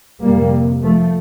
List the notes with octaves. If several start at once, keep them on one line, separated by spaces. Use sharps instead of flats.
F2 C3 G3 A#3
F3 A3